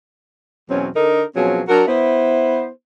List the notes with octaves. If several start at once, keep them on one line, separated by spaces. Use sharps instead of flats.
E2 B2 F#3 C4 C#4
D3 D#4 A#4
B2 F3 F#3 C4 C#4 G#4
F#3 D4 F#4 A#4
B3 E4 C5